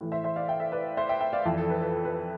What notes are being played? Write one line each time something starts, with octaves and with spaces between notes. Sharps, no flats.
A2 E3
C5 E5
C5 E5
D5 F5
E5 G5
C5 E5
B4 D5
C5 E5
E5 G5
E5 G5
D5 F5
F2 E3
A4
B4
B4
A4
B4
A4